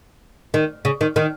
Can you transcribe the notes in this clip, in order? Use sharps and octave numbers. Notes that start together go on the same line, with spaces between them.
D#3
C#3
D#3
D#3